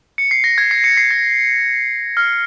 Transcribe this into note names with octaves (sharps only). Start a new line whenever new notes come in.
C#7
C7
A#6
G#6
C7
C#7
C7
A#6
F6